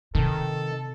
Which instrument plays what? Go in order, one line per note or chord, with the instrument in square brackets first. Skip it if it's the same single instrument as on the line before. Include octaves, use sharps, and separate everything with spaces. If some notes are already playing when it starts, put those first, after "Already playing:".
[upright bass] C3 [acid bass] D#3 [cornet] A4